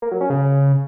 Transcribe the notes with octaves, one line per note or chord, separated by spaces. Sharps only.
A#3
F#3
C#4
C#3